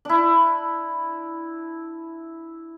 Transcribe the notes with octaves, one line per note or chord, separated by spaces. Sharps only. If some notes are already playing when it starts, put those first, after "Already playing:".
D4 E4